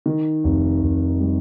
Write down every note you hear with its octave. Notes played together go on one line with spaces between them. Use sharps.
D#3
F1
F1
G3